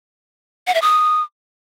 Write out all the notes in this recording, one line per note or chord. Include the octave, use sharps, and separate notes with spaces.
F#5
E5
D#6